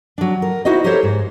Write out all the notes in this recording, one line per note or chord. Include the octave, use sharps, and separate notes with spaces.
F#3 D4
A#4
D#4 E4 F#4 C5 D#5
D#4 G4 A4 A#4 C5 C#5
G#2